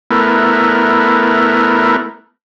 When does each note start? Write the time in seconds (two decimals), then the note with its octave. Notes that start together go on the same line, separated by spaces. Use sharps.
0.11 A3 B3 E4 A#4